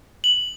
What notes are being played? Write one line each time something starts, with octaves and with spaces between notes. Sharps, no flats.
F#7